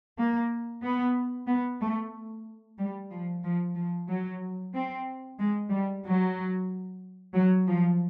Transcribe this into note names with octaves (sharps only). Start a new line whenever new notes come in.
A#3
B3
B3
A3
G3
F3
F3
F3
F#3
C4
G#3
G3
F#3
F#3
F3